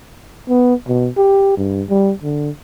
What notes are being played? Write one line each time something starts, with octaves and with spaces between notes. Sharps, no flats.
B3
B2
G4
G2
G3
D3